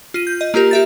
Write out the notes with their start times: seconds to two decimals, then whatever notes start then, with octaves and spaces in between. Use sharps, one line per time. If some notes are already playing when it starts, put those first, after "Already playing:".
0.14 F4 D#7
0.27 G6
0.41 D#5
0.54 A#3 F4 G4 A#4
0.71 G4 E5 A6